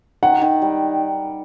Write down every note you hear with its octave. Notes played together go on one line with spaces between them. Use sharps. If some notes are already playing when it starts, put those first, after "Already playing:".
D#3 F#5
D#3
G3